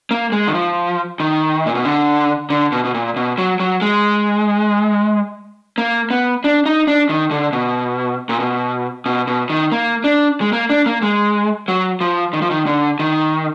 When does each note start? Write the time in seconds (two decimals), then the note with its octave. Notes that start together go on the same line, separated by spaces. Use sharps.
0.11 A#3
0.32 G#3
0.48 D#3
0.54 F3
1.20 D#3
1.66 A#2
1.75 B2
1.85 D3
2.50 D3
2.72 B2
2.85 B2
2.94 A#2
3.16 B2
3.38 F#3
3.60 F#3
3.82 G#3
5.78 A#3
6.10 B3
6.44 D4
6.66 D#4
6.87 D4
7.09 D#3
7.31 D3
7.53 B2
8.29 A#2
8.40 B2
9.06 B2
9.27 B2
9.50 D#3
9.72 A#3
10.04 D4
10.41 G#3
10.53 A#3
10.70 D4
10.86 A#3
11.03 G#3
11.68 F#3
12.01 F3
12.33 D#3
12.42 F3
12.51 D#3
12.66 D3
12.99 D#3